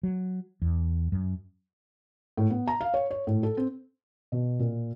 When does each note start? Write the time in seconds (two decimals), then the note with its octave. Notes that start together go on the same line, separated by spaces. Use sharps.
0.03 F#3
0.62 E2
1.12 F#2
2.37 A2
2.50 B3
2.68 A#5
2.81 F5
2.94 C#5
3.11 C#5
3.27 A2
3.43 A4
3.57 C4
4.32 B2
4.59 A#2